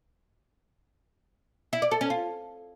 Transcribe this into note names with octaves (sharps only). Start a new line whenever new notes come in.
E4
D5
A4
C#4
F4